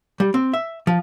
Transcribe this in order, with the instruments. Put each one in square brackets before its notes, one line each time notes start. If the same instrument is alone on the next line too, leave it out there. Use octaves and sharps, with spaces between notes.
[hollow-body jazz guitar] G3
C4
E5
F3